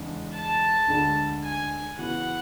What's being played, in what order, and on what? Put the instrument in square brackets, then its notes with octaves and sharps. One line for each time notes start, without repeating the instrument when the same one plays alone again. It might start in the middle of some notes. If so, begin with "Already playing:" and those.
Already playing: [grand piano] E2 C#3 G#3 D4
[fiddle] A5
[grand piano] D2 D3 G#3 D4
[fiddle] G#5
[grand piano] C#3 E3 B3 F#4 [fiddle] F#5